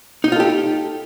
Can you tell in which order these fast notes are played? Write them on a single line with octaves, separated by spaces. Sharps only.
D#4 D#5 F4 A4 G4